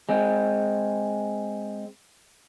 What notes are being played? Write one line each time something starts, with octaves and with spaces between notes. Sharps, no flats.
G#3 C4